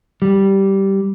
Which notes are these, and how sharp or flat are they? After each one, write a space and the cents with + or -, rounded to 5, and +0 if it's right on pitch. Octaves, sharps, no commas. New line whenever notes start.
G3 -10